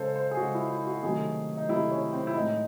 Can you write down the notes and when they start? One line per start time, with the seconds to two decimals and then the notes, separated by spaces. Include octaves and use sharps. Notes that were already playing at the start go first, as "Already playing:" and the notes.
Already playing: C#3 G#3 A4 C5
0.15 C5
0.31 G#4
0.37 C#3 G#3 F#4
0.54 E4
0.70 E4
0.87 F#4
1.03 C3 D#3 F#3 A3 G#4
1.57 D#4
1.69 C3 D#3 F#3 A3 E4
1.91 C#4
2.13 C4
2.27 E4
2.35 A2 G#3 D#4